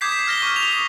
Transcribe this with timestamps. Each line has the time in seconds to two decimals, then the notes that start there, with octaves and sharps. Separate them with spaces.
0.01 D6 D#6 G6 G#6 B6 C7
0.12 B6
0.27 F6 A#6 G7
0.42 C#6 D6 F6
0.56 F7
0.71 D#6 F7